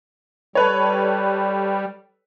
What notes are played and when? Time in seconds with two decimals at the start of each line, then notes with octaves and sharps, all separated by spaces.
0.55 G3 A4 B4 C#5